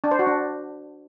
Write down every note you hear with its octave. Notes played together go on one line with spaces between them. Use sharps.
D4
C5
F#4
D4